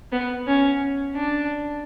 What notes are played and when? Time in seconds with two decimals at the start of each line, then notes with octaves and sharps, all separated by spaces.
0.12 B3
0.47 C#4
1.15 D4